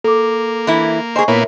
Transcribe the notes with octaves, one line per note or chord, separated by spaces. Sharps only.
A#3 A4 D6
E3 E4
G#4 C5 D#5 G#5 C#6
A#2 A#3 B3 E4 A#4 C#5